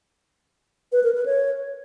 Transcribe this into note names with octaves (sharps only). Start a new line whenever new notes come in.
B4
A#4
B4
C#5